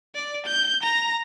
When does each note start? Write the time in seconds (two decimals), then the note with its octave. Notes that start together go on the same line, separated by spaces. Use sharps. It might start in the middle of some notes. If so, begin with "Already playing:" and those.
0.15 D5
0.46 G6
0.83 A#5